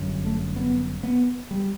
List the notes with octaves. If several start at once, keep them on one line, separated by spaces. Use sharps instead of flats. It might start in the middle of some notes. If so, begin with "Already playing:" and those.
Already playing: G1 F#2
A3
B3
B3
G3